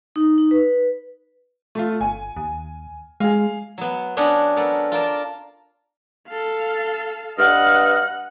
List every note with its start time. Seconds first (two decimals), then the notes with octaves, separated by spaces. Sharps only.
0.16 D#4
0.38 D#4
0.51 B4
1.75 A3 F4
2.01 G1 G#5
2.37 D#2
3.20 G#3 G#4 F5
3.78 F#3 B3
4.17 B3 C#4 D4 D#5 F#5
4.56 B3 A4 A#4
4.92 F4 A#4 D5 A5
6.28 A4 F5
7.38 G2 D#5 F#5 F6